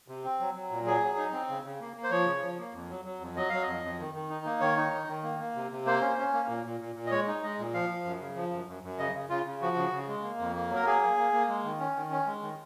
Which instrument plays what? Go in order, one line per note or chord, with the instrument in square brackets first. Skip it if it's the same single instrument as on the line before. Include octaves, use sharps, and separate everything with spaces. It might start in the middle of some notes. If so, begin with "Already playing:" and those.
[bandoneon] C3
C4
F#3
F#3
A#2
F#3 G#4
F#3
D#4
C4
C#3
C#3
A#3
A#3
C5
F3 C#5
C#3
F3
A#3
F2
F#3
F#3
F2
F#3 D#5
F#3 F5
F2 D#5
F2
D#3
D#3
D#4
A#3
D#3 C#5
D#4
D#3
D#3
A#3
A#3
C3
C3
A#3 C5
C#4
C#4
A#3
A#2
A#2
A#2
A#2
D#5
G#3 C#5
D#4
G#3 D#5
A#2
F3 F5
F3
F#2
C#3
F3
F#2
F#2
F#2
C#3 D#5
C#3
C#3 F4
C#3
F3 F#4
C#3
C#3
G#3
A#3
F2
A#3
F#3
A#4
A#3 G#4
A#3
A#3
A#3
G#3
D#3
C#4
D#3
C#4
G#3
D#3